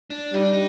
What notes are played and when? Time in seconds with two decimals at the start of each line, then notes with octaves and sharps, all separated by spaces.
0.10 D4
0.33 G3 D#4
0.43 D4
0.53 D#4